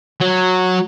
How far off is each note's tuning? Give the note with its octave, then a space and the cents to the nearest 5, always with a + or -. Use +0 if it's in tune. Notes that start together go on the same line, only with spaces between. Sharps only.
F#3 -10